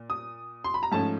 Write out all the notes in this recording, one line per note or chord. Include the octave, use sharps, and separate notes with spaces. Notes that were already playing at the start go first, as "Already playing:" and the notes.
Already playing: A#2
D#6
C6
B5
A#5
G#2 F3 A3 C#4 A5